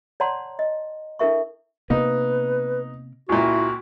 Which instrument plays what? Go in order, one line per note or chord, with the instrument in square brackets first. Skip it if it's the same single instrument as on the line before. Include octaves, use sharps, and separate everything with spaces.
[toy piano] C#5 D5 F#5 A5 A#5 C6
D#5
D4 E4 A4 A#4 E5 C#6
[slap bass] C3 A#3 B3 [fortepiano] D#4 [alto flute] B4
[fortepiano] C#2 A#2 [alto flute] E4 [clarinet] F#4